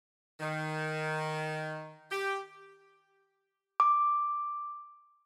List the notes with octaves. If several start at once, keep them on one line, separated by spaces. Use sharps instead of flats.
D#3
G4
D6